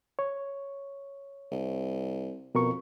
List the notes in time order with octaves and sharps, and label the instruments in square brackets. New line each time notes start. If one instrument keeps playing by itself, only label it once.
[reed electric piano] C#5
[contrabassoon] C2
[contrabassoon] F2 [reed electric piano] B2 A#4 C#6